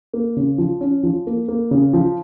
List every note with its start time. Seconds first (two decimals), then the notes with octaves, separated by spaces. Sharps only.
0.13 A#3
0.37 C#3
0.58 F3
0.81 C#4
1.03 F3
1.27 A#3
1.48 A#3
1.71 C#3
1.93 F3